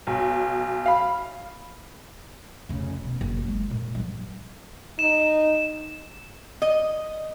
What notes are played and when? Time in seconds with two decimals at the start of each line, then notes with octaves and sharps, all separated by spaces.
0.07 B1
0.86 F5 B5
2.69 F1 C#3
3.04 B2
3.21 F#1
3.48 G#3
3.70 A#2
3.95 G2 F3
4.99 D#4 E7
6.62 D#5